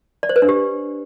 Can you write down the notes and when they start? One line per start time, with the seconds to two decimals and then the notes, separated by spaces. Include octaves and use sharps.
0.23 D5
0.29 C5
0.36 B4
0.42 D4
0.49 G4